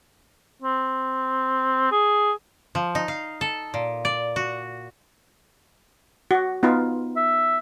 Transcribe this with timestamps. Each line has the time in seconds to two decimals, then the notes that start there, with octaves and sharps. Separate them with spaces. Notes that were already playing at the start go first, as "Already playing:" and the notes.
0.62 C4
1.92 G#4
2.75 F3
2.95 D#4
3.08 F5
3.41 A4
3.74 A#2
4.05 D5
4.36 F#4
6.31 F#4
6.63 B3 D#4 F4
7.17 E5